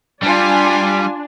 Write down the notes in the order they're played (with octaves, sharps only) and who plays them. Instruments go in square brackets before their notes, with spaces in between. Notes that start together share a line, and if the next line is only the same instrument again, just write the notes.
[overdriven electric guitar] G3 [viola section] D4 [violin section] F4 G#5